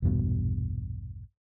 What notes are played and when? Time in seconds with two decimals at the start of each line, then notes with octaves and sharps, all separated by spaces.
0.02 A#1 E2 G2 B2